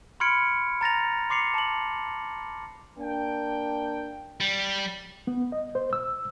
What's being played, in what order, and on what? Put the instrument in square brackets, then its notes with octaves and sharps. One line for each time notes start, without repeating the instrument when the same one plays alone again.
[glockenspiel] B5 C6 F6 G#6 C#7 D7
A#5 A6 A#6 F7
C6 D6 C7 C#7 F7
A5 F#7
[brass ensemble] A#3 D4 G5
[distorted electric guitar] G3
[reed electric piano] B3
D#5
C5
E6